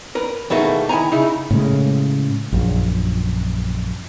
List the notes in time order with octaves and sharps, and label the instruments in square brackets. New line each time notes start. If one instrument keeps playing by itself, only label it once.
[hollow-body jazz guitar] A#4 B4
E2 B2 D#3 A3 A#3
D#3 E4 G#5 A#5
C#3 D#4 E4
[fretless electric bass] A2 C#3 G#3
A#1 F#2